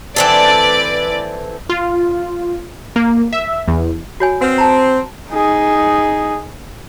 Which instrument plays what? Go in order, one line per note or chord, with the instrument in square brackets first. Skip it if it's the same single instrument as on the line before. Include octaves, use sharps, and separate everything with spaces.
[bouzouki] E3 C4 A4 [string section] B4 D5
[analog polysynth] F4
A#3
E5
E2
[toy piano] F#4 C#5 G#5
[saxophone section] C4 [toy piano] B4 F#5
[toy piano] A5 A#5
[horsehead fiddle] D#4 G#4